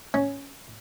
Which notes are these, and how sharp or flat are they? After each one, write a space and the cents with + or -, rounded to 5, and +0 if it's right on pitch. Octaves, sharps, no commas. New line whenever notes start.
C#4 +5